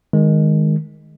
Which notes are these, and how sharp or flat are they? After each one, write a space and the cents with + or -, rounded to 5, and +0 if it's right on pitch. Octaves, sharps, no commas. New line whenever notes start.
D#3 +0 G#3 +0